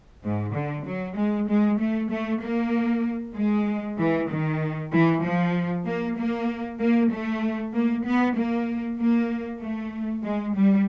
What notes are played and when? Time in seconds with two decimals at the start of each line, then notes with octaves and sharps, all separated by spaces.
0.23 G#2
0.54 D3
0.85 F#3
1.16 G#3
1.48 G#3
1.79 A3
2.10 A3
2.41 A#3
3.35 G#3
3.98 E3
4.29 D#3
4.92 E3
5.24 F3
5.85 A#3
6.17 A#3
6.80 A#3
7.10 A3
7.73 A#3
8.05 B3
8.36 A#3
8.99 A#3
9.61 A3
10.23 G#3
10.55 G3